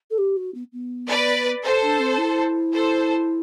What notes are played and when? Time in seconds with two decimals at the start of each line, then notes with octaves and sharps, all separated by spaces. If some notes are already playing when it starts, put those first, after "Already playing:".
0.11 A4
0.18 G4
0.36 F#4
0.54 B3
0.73 B3
1.09 B4 D5
1.64 A4 C5
1.82 D4
2.00 C4
2.18 E4
2.73 A4 C5